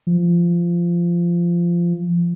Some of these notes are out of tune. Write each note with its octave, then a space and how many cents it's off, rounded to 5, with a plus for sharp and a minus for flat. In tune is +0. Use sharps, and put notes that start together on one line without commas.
F3 -15